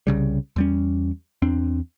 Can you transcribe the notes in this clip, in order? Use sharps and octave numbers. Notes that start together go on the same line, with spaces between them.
C2 C#3 G3
E2 G3 C#4
E2 C4 D4